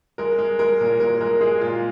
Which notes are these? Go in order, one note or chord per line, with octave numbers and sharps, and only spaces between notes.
G#3 A#4
G#3
G#3 A#4
A#2
A#2 A#4
G#3 A#4
G#3 G#4
A#2 F4